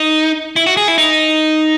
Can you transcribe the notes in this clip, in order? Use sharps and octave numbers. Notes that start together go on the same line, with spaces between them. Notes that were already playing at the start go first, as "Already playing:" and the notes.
Already playing: D#4
E4
F#4
G#4
E4
D#4